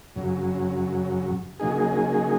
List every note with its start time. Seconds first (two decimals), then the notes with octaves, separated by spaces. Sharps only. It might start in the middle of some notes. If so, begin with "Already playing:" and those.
0.16 F#2 C#3 F#3
1.60 C#3 F#3 A#3 D#4 G#4